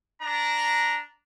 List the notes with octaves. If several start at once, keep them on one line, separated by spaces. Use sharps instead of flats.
D4 A#5